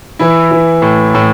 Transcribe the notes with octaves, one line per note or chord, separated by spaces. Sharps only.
E3 E4
E3
A2
A2